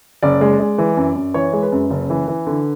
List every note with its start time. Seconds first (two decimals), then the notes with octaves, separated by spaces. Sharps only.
0.23 F#1 D5
0.41 G#3
0.60 G#3
0.78 E3
0.97 F#2
1.16 F#2
1.34 E3 C#5
1.53 G#3
1.63 B4
1.72 F#2
1.90 F#1
2.10 E3
2.28 E3
2.47 D3